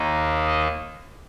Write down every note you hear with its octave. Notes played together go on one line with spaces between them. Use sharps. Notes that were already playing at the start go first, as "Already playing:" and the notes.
Already playing: D#2 D#3 A#3 D#4
D#5